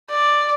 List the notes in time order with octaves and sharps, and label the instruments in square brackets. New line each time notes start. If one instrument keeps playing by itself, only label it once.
[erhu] D5